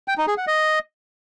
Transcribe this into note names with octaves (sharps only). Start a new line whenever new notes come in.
G5
D#4
G#4
F#5
D#5